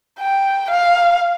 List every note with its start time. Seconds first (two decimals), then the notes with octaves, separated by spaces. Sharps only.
0.19 G5
0.70 F5